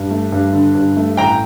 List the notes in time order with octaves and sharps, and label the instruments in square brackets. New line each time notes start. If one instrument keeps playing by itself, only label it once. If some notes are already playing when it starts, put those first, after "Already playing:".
Already playing: [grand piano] G2
A3
G2
D3
G2
A3
A1 G5 A#5